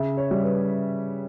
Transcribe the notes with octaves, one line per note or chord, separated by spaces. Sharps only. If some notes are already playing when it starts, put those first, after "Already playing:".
Already playing: C#3 E5
C#5
G3
B4